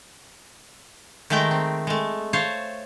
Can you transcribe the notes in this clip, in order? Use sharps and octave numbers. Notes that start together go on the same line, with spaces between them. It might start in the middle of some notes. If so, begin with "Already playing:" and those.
D#3 G#3 A3 A#4 G5
C4
G#3 A3
C5 C#5 F5 A5